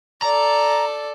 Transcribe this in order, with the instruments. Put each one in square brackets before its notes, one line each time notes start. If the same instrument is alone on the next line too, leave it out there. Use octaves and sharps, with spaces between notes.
[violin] A4 D5 [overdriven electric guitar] A#5